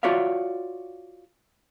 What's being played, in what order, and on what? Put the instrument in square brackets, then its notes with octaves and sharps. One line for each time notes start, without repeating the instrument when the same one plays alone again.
[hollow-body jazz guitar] F4 F#4 C#5 D5 E5 F5